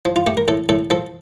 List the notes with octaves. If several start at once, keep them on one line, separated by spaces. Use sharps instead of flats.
F3
F4
A3 G4
A#4
A2 A4
A2 A4
F3 A4